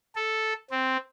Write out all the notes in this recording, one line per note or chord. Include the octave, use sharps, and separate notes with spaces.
A4
C4